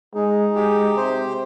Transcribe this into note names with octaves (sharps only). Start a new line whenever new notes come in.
G#3 D#4
G#3 G4
C3 C5